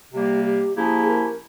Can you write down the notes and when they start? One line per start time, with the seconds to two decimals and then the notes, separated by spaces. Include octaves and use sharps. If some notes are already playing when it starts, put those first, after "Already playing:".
0.13 C3 G3 A#3 G4
0.45 G4
0.76 F3 A#3 C#4 E4 G4 G#4
1.07 A#4